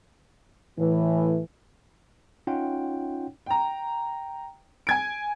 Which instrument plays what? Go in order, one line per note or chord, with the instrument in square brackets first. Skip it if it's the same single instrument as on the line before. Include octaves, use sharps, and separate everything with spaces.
[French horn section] A2 E3
[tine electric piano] C#4 D#4 F4 C#5 F#5 G5
[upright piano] G5 A#5
G#5 G#6 D7